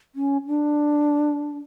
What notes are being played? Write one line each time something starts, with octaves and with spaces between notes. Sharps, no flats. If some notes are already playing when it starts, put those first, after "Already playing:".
C#4
D4